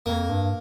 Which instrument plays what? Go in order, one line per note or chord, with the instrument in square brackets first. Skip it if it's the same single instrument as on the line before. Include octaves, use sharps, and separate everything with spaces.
[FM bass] F2 [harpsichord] A#3
[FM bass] G2